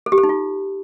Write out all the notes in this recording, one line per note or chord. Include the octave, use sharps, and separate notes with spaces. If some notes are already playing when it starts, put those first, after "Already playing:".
A4
G4
A4
D#4
F4